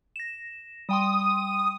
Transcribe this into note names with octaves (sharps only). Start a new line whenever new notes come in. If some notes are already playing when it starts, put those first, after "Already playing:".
A#6 E7
G3 G5 C6 D#6